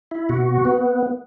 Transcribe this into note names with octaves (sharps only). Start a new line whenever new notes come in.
E4
B2 F#4
B3